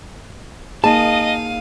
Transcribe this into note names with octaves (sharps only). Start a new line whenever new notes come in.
A#3 D#4 G#4 D#5 F5 A5 D#7